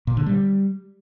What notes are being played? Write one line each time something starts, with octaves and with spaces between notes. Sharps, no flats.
A#2
D3
G3